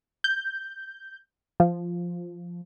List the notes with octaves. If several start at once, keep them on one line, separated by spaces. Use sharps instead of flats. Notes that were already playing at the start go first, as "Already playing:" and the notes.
G6
F3